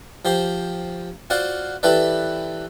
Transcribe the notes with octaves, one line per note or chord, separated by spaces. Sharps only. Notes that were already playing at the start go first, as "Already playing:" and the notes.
F3 G4 C5
F4 F#4 C5 D5 F#5
E3 E4 G4 A4 B4 D5